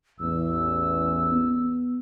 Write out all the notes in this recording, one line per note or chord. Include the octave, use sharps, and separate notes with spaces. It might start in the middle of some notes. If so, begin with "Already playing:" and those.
A1 E2 E6
B3